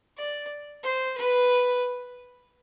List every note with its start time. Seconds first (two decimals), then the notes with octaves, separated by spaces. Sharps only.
0.18 D5
0.84 C5
1.18 B4